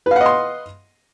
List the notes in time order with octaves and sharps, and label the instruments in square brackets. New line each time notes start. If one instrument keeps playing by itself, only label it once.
[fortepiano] B4
F5
F#5
D#5
C6